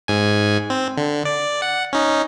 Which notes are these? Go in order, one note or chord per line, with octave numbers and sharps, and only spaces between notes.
G#2 G#5
C4
D3
D5
F#5
C#4 D#4